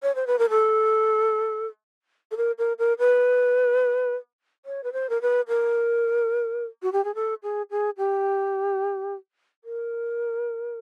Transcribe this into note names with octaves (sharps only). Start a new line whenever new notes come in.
C#5
C5
B4
A#4
A4
A4
A#4
A#4
A#4
B4
C#5
B4
C5
A#4
B4
A#4
F#4
G4
G#4
A4
G#4
G#4
G4
A#4